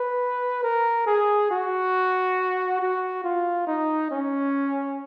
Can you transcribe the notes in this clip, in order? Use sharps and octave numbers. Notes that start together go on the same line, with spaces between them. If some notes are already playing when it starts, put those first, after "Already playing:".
Already playing: B4
A#4
G#4
F#4
F#4
F4
D#4
C#4